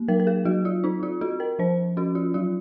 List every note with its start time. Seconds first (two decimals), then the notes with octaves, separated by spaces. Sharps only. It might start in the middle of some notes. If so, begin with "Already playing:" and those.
Already playing: A#3
0.08 F#3 A#4
0.20 A#4
0.27 G#4
0.45 F#3 F#4
0.65 F4
0.84 C4 D#4
1.03 F4
1.21 C4 F#4
1.40 A#4
1.59 F3 C5
1.97 C#4 F#4
2.15 F4
2.34 F#3 F4